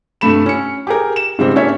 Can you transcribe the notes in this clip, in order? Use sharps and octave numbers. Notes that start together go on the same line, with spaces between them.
G2 C3 A3 B5 E7
C#4 C#7
G4 G#4 A#4
E7
G#2 C#3 G3 G#3 C4
A#3 C#4 D4 C#5 E5